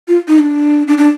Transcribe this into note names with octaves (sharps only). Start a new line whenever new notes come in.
F4
D#4
D4
D4
D4